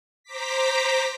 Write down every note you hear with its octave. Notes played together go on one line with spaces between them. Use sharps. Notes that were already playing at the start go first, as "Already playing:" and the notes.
C5 A#5 D6 B6